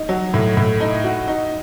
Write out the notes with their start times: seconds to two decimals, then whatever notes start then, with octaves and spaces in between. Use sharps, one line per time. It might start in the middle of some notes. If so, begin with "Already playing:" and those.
Already playing: D#4
0.09 F#3
0.34 A2
0.57 A2
0.80 D#4
1.04 F#4
1.28 D#4